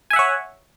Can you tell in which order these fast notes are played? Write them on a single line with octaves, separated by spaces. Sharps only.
G#5 E5 F#5 C#5